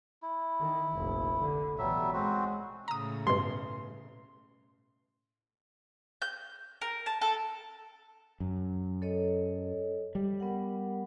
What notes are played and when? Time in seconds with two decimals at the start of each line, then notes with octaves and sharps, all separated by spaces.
0.23 E4
0.60 D#3
0.93 F1 A#1
1.40 D3
1.79 A1 B2 F#3 G3 E5
2.13 G#3 C4 F#4
2.88 A2 C#3 A#5 D#6
3.27 G2 B2 C6
6.22 G6
6.82 A#4
7.06 A5
7.21 A4
8.40 F#2
9.02 A4 C#5 D#5
10.15 G3
10.40 B3 A#4 F#5